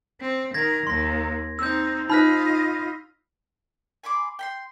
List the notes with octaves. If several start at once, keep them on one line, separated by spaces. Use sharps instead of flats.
C4
D#3 A#4 G#6 A#6
D#2 C6 A#6
C4 D#4 E6 G6
D#4 F4 C5 D#5 B5 F6 B6
G#5 B5 C6 D6
G5 B5 C6